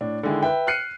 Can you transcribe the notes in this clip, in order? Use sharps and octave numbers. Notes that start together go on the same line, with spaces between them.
A2 D4
D3 D#3 G#3 E4
B4 E5 G5
F6 F#6 C7 C#7 D#7